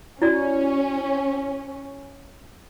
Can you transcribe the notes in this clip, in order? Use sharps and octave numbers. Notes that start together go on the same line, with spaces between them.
C#4 E4 F#4 D5